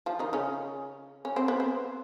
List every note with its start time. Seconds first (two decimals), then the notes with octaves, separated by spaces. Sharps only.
0.06 F3 F4
0.19 D#3 D#4
0.33 C#3 C#4
1.25 C#4
1.36 C4
1.48 B3
1.60 C4